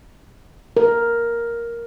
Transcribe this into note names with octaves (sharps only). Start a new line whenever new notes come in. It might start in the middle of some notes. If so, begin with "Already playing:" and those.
A#4